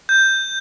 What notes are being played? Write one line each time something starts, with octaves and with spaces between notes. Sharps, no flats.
G6